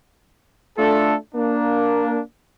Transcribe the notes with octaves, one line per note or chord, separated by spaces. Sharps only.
A3 D4 F4 A4
A#3 D4